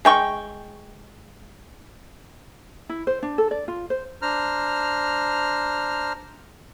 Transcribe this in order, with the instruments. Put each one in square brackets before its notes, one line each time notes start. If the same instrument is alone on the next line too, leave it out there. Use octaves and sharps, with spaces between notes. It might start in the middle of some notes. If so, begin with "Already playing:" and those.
[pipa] G#3 G5 C#6
[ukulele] E4
C5
D4
A4
D5
F4
C5
[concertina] D4 C5 A#5 F6